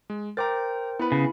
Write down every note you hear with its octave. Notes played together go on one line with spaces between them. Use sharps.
G#3
A#4 C5 G5 A#5 D6 A6
B3 E4 B4 B5
C#3